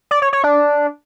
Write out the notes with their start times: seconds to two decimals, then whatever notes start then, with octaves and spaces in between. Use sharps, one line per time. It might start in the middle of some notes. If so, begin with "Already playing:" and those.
0.11 D5
0.22 C#5
0.33 C#5
0.44 D4